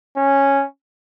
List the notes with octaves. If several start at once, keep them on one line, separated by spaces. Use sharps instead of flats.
C#4